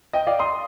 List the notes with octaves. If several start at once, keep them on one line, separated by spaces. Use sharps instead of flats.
D#5 G5
D5 F5
C6 D#6